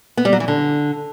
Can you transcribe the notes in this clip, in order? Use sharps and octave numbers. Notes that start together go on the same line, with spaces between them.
B3
G3
F#3
E3
D3